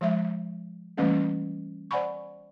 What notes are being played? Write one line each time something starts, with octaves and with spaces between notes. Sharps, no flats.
F3 G#3 E5
E3 G3 A3 A#3 C#4
C5 D5 F#5 G#5 B5 C#6